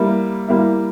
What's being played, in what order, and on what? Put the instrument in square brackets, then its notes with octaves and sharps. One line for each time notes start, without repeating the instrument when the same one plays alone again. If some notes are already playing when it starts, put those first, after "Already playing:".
Already playing: [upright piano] G3 A#3 E4
G3 A#3 E4